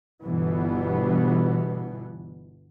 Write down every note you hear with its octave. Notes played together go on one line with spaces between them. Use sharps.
G1 B2 E3 B3